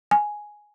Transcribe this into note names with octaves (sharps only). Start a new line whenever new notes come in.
G#5